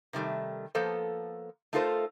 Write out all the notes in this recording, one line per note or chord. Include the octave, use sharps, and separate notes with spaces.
C3 D#3 G3 A3
F3 A#3 B3 A4 C5
A3 D#4 F4 A4 A#4 C5